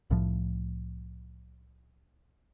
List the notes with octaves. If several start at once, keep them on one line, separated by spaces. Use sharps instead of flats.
C2 A2 F3